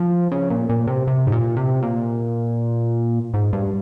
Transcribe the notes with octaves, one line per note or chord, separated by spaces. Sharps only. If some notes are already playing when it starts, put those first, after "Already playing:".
Already playing: F3
C#3
A#2
A#2
C3
C3
G#2
A#2
C3
A#2
G#2
G2